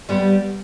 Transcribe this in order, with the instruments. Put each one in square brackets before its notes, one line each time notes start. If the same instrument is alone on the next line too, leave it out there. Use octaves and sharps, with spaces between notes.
[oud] G3 B3